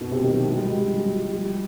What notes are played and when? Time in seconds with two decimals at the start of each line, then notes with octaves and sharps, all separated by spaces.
0.01 B2
0.12 C3
0.22 D#3
0.34 F#3
0.45 G3
0.56 G#3
0.66 G3
0.77 F#3
0.88 F3
0.98 F#3
1.05 F3
1.32 G3